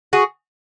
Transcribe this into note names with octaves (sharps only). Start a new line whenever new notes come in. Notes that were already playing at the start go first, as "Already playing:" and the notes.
F#4 G#4